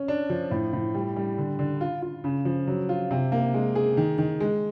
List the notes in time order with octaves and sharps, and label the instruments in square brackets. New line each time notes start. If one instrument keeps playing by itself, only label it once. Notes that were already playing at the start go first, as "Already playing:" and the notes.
Already playing: [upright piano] C#4
D4
F3
A2
A2
G3
G3
D3
D3
F4
F4
C#3
F3
F#3
F4
C3
A#3
G#3
G#4
D#3
D#3
G#3